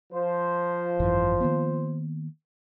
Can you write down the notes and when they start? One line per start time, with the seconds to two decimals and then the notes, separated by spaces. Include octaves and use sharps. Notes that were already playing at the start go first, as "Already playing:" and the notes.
0.12 F3 C5
1.00 G#1 F#2 E3
1.41 D#3 A#3 B3